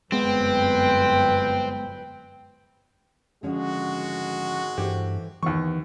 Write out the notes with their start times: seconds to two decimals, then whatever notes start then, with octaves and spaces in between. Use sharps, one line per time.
0.12 G1 F#2 G#3 B3 C4 B4 G5
3.43 G#1 D3 F3 G#3 C#4 F#4
4.78 G2 E3 G4 A4 C5
5.43 D#2 E3 B3 C#6